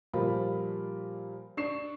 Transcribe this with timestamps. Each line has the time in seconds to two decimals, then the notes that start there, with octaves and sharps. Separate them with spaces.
0.13 A#2 F3 G3 F4 A#4 B5
1.57 D4 C#6 C7 E7